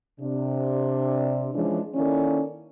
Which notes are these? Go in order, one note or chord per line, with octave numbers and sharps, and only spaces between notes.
C3 D4
E3 F3 G#3 C#4 D4
D#3 A#3 C#4 E4 A4 D5